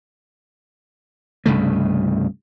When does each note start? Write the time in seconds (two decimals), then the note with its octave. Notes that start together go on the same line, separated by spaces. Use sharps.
1.46 C2 G2 C#3 A3